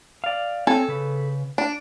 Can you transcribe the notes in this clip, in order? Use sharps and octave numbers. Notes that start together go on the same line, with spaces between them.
D5 F5
C4 A4 C#5 G#5
C#3 B4
D4